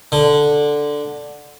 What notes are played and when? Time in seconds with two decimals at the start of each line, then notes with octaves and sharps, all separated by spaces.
0.12 D3